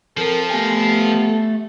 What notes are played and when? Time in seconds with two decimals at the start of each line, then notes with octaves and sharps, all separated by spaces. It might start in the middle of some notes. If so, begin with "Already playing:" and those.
0.17 F3 C4 A4 A#4
0.50 A3 B3 G4 G#5